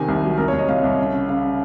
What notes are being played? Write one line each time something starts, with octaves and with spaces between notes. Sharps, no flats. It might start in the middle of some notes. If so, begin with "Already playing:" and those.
Already playing: C3 D#3 G#5
C2
F#3
C2 A#4
C#5
C2
D#5
C2 F5
C2
C#3
C#3
C#3 F5